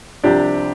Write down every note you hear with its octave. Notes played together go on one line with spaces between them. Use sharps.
C2 C3 F3 D4 G4